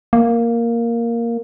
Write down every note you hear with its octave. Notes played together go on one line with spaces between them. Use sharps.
A#3